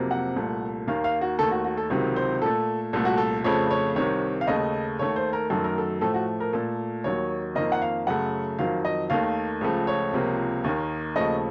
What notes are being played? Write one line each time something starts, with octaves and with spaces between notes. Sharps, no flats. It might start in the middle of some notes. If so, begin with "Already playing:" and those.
Already playing: F2 C3 F#3 A#3
F#5
C2 A#2 A3
D#2 D#3 A#3 F5
F5
F#4
D#2 D#3 A3 A4
F#4
F#4
A4
C#2 C3 D#3 F#3
C5
A#2 A3 A4
C2 A#2 A3 A4
F#4
A4
F2 C#3 F3 A3 C#5
C#5
C2 C3 D#3 C#5
F5
D#2 C#3 A3 D#5
D#2 D#3 A3 C#5
C5
A#4
F#2 D#3 F#3 A3 A4
A#4
A4
A2 F3 A3 A4
F#4
A#4
A#2 A3 A4
D#2 D#3 F#3 C#5
F2 D#3 A#3 D#5
F#5
F5
F#2 C#3 A3 F#5
F2 D#3 F#3 F5
D#5
D#2 D#3 A3 F5
C#2 C#3 F3 A3
C#5
C#2 C3 F3 A#3
D#2 D#3 A#3
D#2 C#3 F3 A3 D#5